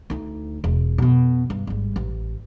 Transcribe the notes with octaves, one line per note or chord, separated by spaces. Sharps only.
D2 D#4
E1
F2 B2
G2
G#1 G3
A1